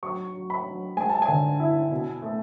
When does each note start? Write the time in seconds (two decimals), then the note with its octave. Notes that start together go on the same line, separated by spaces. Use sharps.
0.03 F#3 C#6
0.34 F#3
0.50 B5
0.66 F#3
0.97 G#3 G#5
1.09 A5
1.22 G#5
1.28 D3
1.60 E4
1.91 B2
2.22 A3